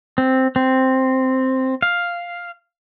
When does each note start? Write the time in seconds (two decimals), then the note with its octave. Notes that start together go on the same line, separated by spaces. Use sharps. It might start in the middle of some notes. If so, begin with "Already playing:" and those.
0.18 C4
0.56 C4
1.82 F5